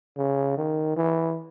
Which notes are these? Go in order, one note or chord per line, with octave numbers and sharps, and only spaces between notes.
C#3
D#3
E3